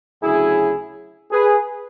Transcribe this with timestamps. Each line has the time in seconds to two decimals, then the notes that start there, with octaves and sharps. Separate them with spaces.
0.22 D2 C#3 F#3 E4 G#4
1.31 G#4 B4